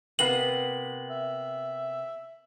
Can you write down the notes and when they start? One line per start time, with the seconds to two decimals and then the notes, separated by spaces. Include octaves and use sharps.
0.19 C3 A#3 B3 F#7
1.10 E5